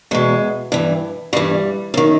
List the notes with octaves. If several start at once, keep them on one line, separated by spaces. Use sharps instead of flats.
E2 B2 G#3
G2 E3
G2 E3 G3
F#2 D#3